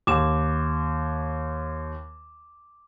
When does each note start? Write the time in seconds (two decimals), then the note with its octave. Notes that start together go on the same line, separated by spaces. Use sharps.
0.07 D#2 D6 E7